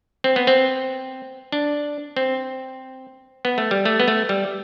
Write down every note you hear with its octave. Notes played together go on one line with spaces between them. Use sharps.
C4
B3
C4
D4
C4
B3
A3
G3
A3
B3
A3
G3